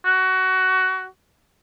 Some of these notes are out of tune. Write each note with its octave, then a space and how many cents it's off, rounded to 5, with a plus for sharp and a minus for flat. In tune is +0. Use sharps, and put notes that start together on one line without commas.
F#4 +20